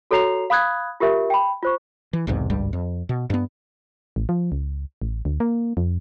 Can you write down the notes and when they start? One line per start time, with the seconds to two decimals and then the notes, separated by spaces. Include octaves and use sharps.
0.11 F#4 A4 C#5 A#5 C7 F7
0.50 F5 B5 D#6 F#6 G#6
1.00 F4 G4 A#4 E5
1.30 G5 B5
1.63 F4 C5 C#6
2.13 E3
2.27 B1 E2 G#2 C3
2.50 G#1 C#2 G2 G3
2.73 F2
3.09 B2
3.30 G2 B3
4.16 A1
4.29 F3
4.52 C#2
5.02 A1
5.25 D2
5.40 A#3
5.77 F2